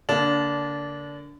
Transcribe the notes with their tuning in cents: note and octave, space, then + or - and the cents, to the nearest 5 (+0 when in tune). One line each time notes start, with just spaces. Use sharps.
D3 -35 A#3 +0 D4 -20